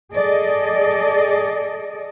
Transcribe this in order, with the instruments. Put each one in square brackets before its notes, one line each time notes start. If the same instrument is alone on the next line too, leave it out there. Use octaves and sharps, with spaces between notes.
[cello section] G#4 A4 D5 D#5